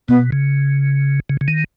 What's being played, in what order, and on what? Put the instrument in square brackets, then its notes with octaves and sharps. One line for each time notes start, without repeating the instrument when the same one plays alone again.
[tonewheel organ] B2 [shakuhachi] B3
[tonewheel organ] C#3
C#3
C#3
D#3